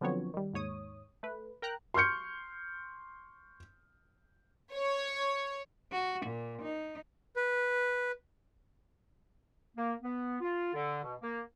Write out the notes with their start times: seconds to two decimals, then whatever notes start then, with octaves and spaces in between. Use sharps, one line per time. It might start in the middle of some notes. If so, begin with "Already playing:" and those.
0.01 D3 F3 F#3 B3 C4 C#5
0.34 D#3 G3
0.54 D#2 G#2 C#5 D#6
1.23 A3 B4
1.62 A#4 G5 A#5 F#6
1.94 C6 C#6 F6 G6 C#7
4.74 C#5
5.91 F#4
6.26 A#2
6.62 D#4
7.36 B4
9.76 A#3
10.01 B3
10.41 F4
10.73 D3
11.03 B2
11.21 A#3